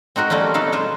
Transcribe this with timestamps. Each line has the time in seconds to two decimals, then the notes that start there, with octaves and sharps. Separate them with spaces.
0.16 C4 D#4 F#4 A#4
0.30 G3 A3 A#3 C4 C#4
0.54 B2 D#4 E4 A4 F5
0.72 G#3 F4 C5